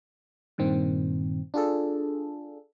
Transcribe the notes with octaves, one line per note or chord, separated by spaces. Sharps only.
G2 A#2 D#3 C4
D4 F4 G#4 A4